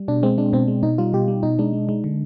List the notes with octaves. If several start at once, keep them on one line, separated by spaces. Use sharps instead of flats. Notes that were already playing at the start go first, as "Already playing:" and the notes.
Already playing: G3
B2 D4
G#3 C4
G#3 D4
B2 C4
G#3
B2 D#4
G3 F4
B2 G4
G3
B2 D#4
G#3 D4
G#3
G#3
D3